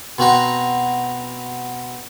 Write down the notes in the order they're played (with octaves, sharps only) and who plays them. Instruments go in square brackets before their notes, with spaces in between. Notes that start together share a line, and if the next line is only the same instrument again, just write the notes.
[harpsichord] B2 C4 F#4 A#5